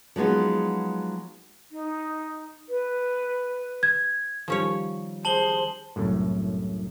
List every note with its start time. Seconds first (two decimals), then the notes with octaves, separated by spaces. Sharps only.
0.16 F3 F#3 G#3 B3 D#4
1.72 D#4
2.69 B4
3.83 G#6
4.48 D#3 F3 G3 C#4 C#5
5.25 G#4 C5 A5 F#7 G7
5.96 C2 F#2 A2